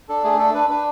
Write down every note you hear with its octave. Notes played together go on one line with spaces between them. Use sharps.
D4 A4
A3 G#4
D4 A4
D4 B4
D4 B4